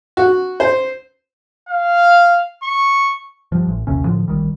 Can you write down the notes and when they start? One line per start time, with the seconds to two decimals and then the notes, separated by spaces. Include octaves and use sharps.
0.17 F#4
0.60 C5
1.69 F5
2.63 C#6
3.52 G2 F3
3.68 A1
3.87 A#1 D#2 C3 C#4
4.04 A2 D3 F3
4.28 A#1 D#3 G3